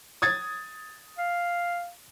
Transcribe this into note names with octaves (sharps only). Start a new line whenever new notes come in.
D#6 G#6 A6
F5